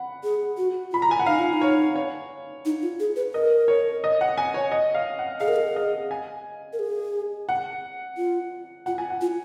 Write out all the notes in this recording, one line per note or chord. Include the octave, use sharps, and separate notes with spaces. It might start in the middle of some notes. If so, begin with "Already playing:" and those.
Already playing: F#5 B5
G#4
F#4
F4 B5
A#5
G#5
F#5
D#4 F5
F4
D#4
C#5
C#5
D#4
F4
G#4
B4
A#4 D#5
C#5
D#5
F#5
G#5
C#5
D#5
F5
F#5
G#4 F5
A#4
G#4
D#5
G#5
A#4
G#4
F#5
F4
F4 F#5
G#5
F#5
F4